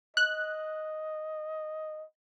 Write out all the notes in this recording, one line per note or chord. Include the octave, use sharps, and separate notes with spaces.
D#5 F#6